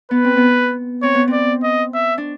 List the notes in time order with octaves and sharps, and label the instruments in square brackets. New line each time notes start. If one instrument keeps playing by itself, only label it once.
[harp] B3 [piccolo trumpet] B4
[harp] C4
B3
[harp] C4 [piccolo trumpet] C#5
[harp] B3
[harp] C4 [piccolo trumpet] D5
[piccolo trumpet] D#5
E5
[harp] D4